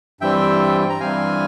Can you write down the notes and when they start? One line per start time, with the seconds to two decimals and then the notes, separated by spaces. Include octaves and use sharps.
0.21 G2 E3 G3 C4 E5 G5
0.90 A#5
1.00 G2 E3 G3 C4 F5 G#5